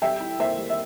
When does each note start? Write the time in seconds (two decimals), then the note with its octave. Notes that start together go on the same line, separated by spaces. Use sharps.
0.02 G3 E5 G5
0.20 E4
0.40 A#3 C5 E5
0.58 G3
0.70 E5